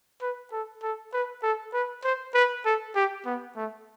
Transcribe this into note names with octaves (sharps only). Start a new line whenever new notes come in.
B4
A4
A4
B4
A4
B4
C5
B4
A4
G4
B3
A3